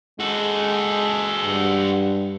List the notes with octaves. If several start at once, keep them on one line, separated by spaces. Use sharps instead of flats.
G#3 F#4 A4
G2